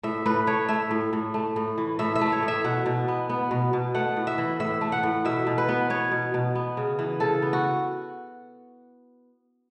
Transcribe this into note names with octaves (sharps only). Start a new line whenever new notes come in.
A2 E5
A2 B4
A3 C#5
A3 E5
A2
A2
A3
A2
E3
A2 E5
E5
A3
C#5
A2
E5
B2 F#5
B2
B3
B3
B2
B2
A3 F#5
A2
E5
E3
A2 E5
A3
F#5
A2
B2 E5
B2
B4
B3
B3 C#5
B2
B2
B3
C#3
E3
C#3 A4
B3
F#4